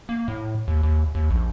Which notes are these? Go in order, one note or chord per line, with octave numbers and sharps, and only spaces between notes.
A#3
A2
D#2
D#2
D#2
A#1